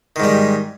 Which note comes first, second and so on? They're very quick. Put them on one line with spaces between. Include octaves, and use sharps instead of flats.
D#3 G#2 G3